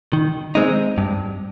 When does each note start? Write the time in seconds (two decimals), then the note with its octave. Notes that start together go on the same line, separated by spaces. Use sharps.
0.13 D#3
0.55 G#3 C4 D#4
0.98 G2